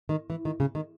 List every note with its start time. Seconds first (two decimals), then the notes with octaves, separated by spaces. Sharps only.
0.09 D#3
0.30 E3
0.45 D#3
0.60 C#3
0.75 D#3